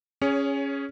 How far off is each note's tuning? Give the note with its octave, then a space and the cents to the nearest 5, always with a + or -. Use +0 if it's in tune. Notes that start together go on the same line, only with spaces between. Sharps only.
C#4 +0 G#4 -5 C#5 +25